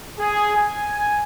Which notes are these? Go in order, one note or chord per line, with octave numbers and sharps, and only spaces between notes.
G#4
G#5